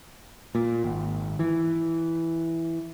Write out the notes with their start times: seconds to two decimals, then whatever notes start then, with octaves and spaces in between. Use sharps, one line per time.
0.55 A#2
0.84 G#1
1.39 E3